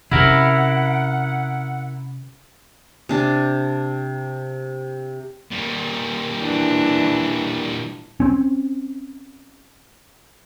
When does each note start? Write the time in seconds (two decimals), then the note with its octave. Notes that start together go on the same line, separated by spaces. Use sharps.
0.11 C3 C#4 E4 A#4 F#5
3.09 C3 D4
5.51 A#2 G3
6.39 E3 D4
8.20 C4 C#4